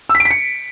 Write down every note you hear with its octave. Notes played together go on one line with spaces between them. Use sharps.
E6
B6
D7
B6
C#7